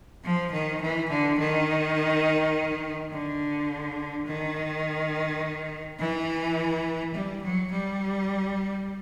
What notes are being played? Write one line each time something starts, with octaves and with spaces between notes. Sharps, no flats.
F3
D#3
E3
D3
D#3
D3
D#3
E3
G3
F#3
G3